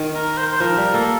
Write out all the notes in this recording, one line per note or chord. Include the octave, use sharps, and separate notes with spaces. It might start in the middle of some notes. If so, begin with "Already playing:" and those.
Already playing: D#3
A#4
C5
C5
F3 A#4
G3
A#3 A4